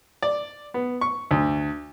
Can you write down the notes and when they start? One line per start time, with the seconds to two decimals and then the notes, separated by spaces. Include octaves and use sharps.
0.22 D5
0.74 B3
1.01 C#6
1.31 D2